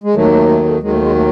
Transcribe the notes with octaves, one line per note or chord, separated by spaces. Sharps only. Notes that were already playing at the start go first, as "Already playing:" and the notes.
G#3
D#2 D#3 F#3 A3
A3
A3
A3
D#2 D#3 F#3 G#3
A3
G#3
A3